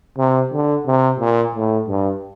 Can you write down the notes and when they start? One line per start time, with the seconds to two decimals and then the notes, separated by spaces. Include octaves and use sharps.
0.18 C3
0.52 D3
0.86 C3
1.20 A#2
1.55 A2
1.88 G2